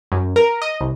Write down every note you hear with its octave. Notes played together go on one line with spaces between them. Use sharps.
F#2
A#4
D#5
C2